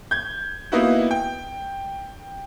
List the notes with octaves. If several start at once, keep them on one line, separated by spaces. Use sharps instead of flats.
G6 G#6
A#3 B3 D#4 E4 F#4
G5